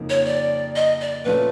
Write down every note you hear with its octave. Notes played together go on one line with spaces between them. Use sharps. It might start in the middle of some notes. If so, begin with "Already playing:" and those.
Already playing: F2 C#3 F3 A#3 D#4
C#5
D5
D#5
D5
A#2 F3 A3 C#4 F4 B4